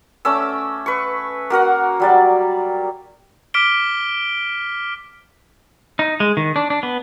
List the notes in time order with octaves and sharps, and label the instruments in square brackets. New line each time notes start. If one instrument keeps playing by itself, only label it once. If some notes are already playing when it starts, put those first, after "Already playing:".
[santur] A3 C#4 D6 E6
B4 C#6
A#3 F#4 A#4 F#5
F#3 G3 D5
[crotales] D6 F6 B6 D7 G7
[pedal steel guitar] D#4
G#3
D#3
D4
D4
B3